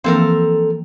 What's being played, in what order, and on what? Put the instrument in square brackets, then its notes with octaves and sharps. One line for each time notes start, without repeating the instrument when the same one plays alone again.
[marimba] E3 F3 A#3 [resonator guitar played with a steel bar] C4 A4 A#4